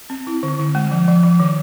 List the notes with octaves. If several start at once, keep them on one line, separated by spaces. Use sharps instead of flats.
C4
E4
D3
D3
G#3
F3
F3
F3
D#3